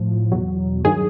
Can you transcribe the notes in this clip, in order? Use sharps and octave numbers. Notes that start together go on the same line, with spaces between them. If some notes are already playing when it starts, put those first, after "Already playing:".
Already playing: A2 F3
E2 B2 F#3
G2 D#3 F#3 G#4